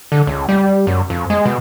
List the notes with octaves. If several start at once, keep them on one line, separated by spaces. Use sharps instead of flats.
D3
C#2
G3
F#2
F2
G#3
B2